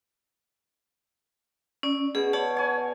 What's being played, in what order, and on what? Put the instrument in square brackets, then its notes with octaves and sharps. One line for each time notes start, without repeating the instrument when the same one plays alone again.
[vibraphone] C#4 D5
[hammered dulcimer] B2 [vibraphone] G#4
[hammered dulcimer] C#5 [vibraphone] D5 F#5 A5
[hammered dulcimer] C#5 G#5